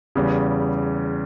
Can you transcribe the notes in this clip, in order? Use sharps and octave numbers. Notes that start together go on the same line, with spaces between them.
E2 C#3 G3